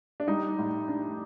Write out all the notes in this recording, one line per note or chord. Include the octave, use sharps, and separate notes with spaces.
D4
G3 D#4
A2
D4